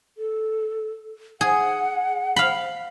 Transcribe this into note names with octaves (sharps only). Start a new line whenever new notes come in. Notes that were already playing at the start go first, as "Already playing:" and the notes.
A4
G#4 F#5
F5 B5